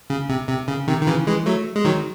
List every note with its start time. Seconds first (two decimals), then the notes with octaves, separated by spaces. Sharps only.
0.10 C#3
0.29 C3
0.48 C3
0.68 C#3
0.87 C3 D#3
1.02 D#3
1.07 C#3 E3
1.27 E3 G#3
1.46 F#3 A3
1.76 G#3
1.85 D#3 F#3